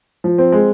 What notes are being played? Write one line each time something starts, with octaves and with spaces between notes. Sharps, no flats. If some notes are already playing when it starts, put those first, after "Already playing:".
F3
C4
G#3